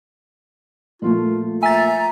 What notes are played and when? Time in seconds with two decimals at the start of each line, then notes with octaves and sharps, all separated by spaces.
1.02 A#2 F3 A3 F4
1.63 E5 G#5 A#5 A6